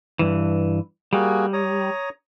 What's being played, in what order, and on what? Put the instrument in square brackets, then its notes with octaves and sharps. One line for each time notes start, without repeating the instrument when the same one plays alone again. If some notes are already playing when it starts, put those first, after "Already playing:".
[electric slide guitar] G2 E3
[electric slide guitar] G3 [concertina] A#3 F#4 G#4
[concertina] C#5 A#5 D#6